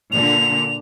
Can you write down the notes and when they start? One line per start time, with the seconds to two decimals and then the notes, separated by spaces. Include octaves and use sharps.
0.12 A#2 D3 F7